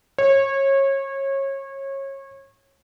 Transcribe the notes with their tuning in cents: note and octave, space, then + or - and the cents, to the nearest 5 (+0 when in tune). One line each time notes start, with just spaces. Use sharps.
C#5 -25